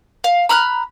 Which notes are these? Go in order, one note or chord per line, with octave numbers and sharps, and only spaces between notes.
F5
A#5 B5 F6 F#6